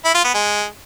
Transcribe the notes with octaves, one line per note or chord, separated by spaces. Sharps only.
E4
F4
B3
G#3